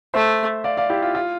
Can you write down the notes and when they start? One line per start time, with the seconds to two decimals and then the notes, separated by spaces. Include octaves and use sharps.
0.14 A3 C5 E5
0.64 D5 F5
0.77 D5 F5
0.90 E4 G4
1.03 F4
1.15 F4